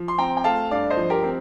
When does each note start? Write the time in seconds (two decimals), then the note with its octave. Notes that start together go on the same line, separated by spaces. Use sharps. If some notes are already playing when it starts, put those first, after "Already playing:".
Already playing: F3
0.08 C6
0.18 C4 G5 A#5
0.37 G5
0.44 A3 F5 A5
0.71 G2 D5 F5
0.90 C5 D#5
0.97 F3
1.10 G4 A#4
1.23 C4